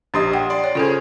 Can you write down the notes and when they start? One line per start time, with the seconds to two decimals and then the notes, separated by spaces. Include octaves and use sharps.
0.14 A#1 D4 G4 D#5 C6 D#6
0.33 F#5 G5
0.50 D5 C6
0.64 C#5
0.75 C#3 F4 G#4 A4 C5